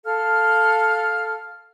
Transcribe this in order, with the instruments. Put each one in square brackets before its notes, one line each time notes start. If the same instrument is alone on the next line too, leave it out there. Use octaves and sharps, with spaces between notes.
[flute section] A4 F5 F6